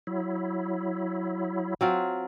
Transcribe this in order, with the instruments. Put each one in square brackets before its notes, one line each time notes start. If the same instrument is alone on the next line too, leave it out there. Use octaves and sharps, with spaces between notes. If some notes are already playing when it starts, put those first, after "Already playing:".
[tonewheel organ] F#3 E4
[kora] F#3 C4 F4